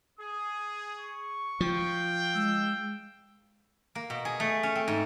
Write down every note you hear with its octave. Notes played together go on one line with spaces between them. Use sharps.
G#4 D#6
C#6
F3 F5 G5
G#3 E6
A#3
B2
G#4
A3
C#4
C4
G#2